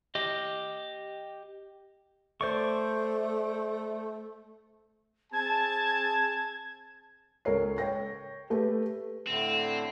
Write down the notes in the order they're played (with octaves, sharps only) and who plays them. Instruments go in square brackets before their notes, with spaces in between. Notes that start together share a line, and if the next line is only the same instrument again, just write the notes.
[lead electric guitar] G4 D#5
[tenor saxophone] A3 [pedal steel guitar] C5 D5 C#6
[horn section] C4 G#4 A5 [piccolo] G#6
[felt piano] C#2 A4 A#4 C#5 C7
C#5 G5 A#6
A3 G4 B4
[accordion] A2 D3 [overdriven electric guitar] C4